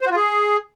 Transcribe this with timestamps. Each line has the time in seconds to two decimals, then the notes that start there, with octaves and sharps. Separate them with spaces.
0.01 C5
0.06 F#4
0.11 F4
0.16 G#4